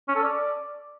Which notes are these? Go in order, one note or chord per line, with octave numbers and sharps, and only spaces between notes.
C#4
A4
D5